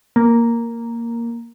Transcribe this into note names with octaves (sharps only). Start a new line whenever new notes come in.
A#3